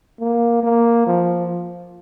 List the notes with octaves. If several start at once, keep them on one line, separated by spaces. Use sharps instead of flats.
A#3
A#3
F3